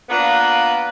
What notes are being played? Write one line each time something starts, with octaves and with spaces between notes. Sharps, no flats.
A#3 B3 D4 F4 B4